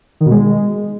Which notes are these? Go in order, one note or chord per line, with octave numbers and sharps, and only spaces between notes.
D#3
B2
G#3